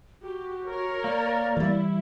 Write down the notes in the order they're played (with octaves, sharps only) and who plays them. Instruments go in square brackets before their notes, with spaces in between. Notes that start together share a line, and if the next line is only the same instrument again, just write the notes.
[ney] F#4 [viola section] G4
[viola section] A#4 C#5
[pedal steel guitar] A#3 [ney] D5
[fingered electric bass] E3 G3 [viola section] E4